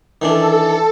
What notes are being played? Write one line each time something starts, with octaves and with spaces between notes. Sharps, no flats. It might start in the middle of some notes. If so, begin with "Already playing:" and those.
D#3 E3 D4 A4